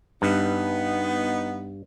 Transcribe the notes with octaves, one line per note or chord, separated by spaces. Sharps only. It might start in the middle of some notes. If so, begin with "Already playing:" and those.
G2 B3 D#4